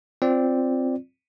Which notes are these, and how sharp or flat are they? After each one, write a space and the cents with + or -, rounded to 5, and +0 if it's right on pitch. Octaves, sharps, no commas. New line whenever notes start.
C4 +0 F4 -5 D5 +0